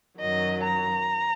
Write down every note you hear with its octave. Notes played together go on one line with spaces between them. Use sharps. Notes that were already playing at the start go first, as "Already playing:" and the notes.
F#2 D#3 F#3 D#5
A#5